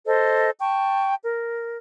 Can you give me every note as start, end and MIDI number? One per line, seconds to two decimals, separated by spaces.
0.06 0.50 69
0.06 0.50 72
0.06 0.50 75
0.59 1.15 79
0.59 1.15 81
0.59 1.15 85
1.23 1.78 70